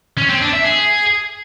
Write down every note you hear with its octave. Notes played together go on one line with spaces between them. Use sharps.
C#4
C4
D4
E5
G#4